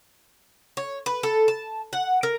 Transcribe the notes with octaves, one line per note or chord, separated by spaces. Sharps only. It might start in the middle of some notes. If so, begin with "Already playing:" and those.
C#5
B4
A4
A5
F#5
A#4